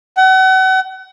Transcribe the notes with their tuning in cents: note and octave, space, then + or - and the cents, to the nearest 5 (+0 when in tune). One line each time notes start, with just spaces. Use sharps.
F#5 +35